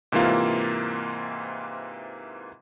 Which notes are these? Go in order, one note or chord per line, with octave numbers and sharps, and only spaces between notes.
G#2 C3 E3 A#3 F4